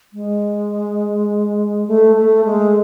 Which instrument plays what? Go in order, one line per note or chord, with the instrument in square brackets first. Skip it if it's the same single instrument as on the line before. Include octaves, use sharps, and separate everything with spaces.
[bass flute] G#3
A3
A3
G#3